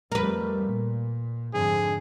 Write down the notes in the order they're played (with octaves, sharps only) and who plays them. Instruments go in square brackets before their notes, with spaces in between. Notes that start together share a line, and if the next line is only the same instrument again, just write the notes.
[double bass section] F2 G3 A3 [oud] A#4 B4
[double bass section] A#2
[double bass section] F2 G#2 D3 [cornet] G#4